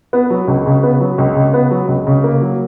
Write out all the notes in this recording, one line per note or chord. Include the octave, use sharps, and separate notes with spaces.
B3
F#3
C#2
C#3
B3
F#3
C#2
C#3
B3
F#3
C#2
C#3
A#3
F#3